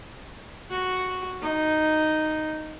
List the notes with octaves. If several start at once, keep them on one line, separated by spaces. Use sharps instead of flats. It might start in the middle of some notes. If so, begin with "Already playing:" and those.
F#4
D#4